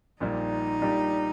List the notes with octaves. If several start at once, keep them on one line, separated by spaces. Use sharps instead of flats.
A#1 A#2 G3 D#4
A#2 G3 D4 G4